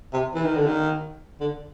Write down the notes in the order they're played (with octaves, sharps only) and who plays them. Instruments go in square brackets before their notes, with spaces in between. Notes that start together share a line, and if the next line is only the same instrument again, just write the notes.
[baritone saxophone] C3
E3
D#3
D3
D#3
D3